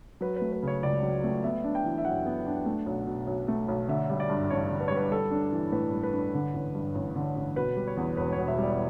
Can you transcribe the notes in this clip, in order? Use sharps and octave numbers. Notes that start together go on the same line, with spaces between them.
F#3 B4
B4
A3
B4
C#3 C#5
C#2 D5
F#3
A3
B3 E5
D4
G5
E3
E5
F#2 F#5
B3
D4
A3
B1
B2
B1
A3
B1
D3 E5
G3
D5
G2
A1 C#5
D3
B4
C#5
G3
B4
G3 A4
D4
E3
A2 B4
G3
B4
D4
D3
A1
G2
A1
D3
A1
B2 B4
G3
C#5
E2
E1 B4
B2 C#5
E5
G3 D5